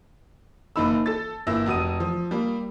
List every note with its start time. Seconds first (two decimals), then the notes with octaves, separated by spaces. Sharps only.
0.76 F#1 A#3 D#4 B5 E6
1.06 A4 A6
1.47 G1 A#3 E4 E6 A#6
1.66 F1 F#4 D#6 D#7
2.00 F3
2.31 G3 A#3